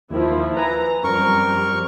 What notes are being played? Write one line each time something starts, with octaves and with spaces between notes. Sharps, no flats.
D#2 D#3 F3 E4
B4 G#5 A#5
F#2 F3 G3 C4 A#4 C#6